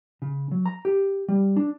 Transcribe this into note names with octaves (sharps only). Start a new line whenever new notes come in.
C#3
F#3
A#5
G4
G3
D4